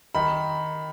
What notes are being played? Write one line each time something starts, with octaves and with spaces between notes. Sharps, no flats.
D#3 B5